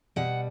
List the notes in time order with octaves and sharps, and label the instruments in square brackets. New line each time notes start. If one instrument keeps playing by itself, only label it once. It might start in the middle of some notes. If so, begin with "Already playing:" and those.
[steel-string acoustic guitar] B2 G3 F#5